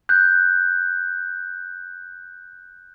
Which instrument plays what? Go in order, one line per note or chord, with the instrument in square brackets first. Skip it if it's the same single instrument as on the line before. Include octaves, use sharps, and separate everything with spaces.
[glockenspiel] F#6 G6